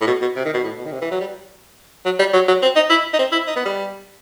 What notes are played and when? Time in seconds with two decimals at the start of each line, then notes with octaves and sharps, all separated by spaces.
0.01 A2
0.07 B2
0.21 B2
0.36 C3
0.45 D#3
0.54 B2
0.63 A2
0.78 B2
0.85 D#3
0.92 C3
1.01 E3
1.11 F#3
1.20 G3
2.05 F#3
2.19 G3
2.33 F#3
2.48 F#3
2.62 C4
2.76 D#4
2.90 E4
3.13 D#4
3.19 C4
3.32 E4
3.47 D#4
3.56 B3
3.65 G3